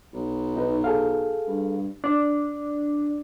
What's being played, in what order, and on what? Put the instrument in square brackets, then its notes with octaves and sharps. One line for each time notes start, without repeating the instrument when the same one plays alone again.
[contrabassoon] B1
[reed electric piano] D#4 B4
G#4 A4 F5
[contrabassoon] G2
[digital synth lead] D4